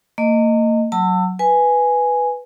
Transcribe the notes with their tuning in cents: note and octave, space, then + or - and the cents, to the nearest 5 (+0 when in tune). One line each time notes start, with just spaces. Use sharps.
A#3 -35 D#5 +0
F#3 +0 A5 +35 E6 +0
B4 +0 G#5 +0